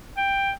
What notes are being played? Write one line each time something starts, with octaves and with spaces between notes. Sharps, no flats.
G5